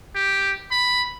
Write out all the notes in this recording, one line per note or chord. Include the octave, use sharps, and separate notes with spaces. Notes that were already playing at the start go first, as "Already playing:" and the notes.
G4
B5